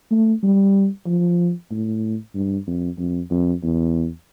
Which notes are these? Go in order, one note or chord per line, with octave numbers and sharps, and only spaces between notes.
A3
G3
F3
A2
G2
F2
F2
F2
E2